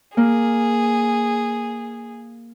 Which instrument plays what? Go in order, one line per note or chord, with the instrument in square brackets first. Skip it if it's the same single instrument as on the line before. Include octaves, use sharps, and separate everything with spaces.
[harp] A#3 [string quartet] G#4